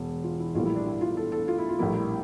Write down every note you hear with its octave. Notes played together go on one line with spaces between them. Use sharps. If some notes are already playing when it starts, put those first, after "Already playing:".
Already playing: E1
F4
E4
A#1 A2 E3 G3 A#3 F4
E4
D4
E4
F4
A4
A4
F4
E4
F4
A#1 A2 G3 A#3 E4
E4